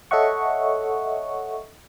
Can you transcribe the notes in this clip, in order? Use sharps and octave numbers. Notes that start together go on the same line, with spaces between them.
A4 C#5 D#5 E5 F#5 C#6